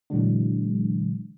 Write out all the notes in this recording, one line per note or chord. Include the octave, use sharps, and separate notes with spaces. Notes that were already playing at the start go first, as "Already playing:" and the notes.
A#2 D3 E3 F#3 G#3 D4